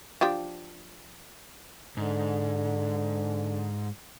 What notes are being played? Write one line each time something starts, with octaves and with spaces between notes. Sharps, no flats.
F3 D4 G4
G#2 D3